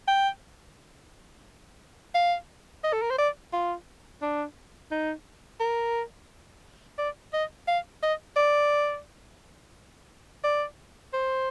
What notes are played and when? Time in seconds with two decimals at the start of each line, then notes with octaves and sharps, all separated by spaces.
0.08 G5
2.14 F5
2.84 D#5
2.93 A4
3.02 A#4
3.10 C5
3.18 D5
3.53 F4
4.22 D4
4.91 D#4
5.60 A#4
6.98 D5
7.33 D#5
7.68 F5
8.03 D#5
8.36 D5
10.44 D5
11.13 C5